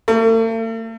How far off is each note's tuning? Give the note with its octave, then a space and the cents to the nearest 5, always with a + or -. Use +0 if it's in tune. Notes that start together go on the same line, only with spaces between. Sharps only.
A3 +45